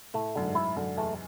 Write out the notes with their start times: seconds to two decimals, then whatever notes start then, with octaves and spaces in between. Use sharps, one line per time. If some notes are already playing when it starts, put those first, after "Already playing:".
0.14 A2 A3
0.36 F#2 D3
0.45 G#2
0.55 E4
0.76 F#2 D3
0.97 E2 A3